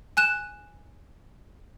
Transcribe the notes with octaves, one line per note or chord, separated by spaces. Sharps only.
G#5 F#6 E7